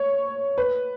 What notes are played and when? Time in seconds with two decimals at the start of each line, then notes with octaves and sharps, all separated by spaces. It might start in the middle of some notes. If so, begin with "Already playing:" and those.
Already playing: C#5
0.58 B4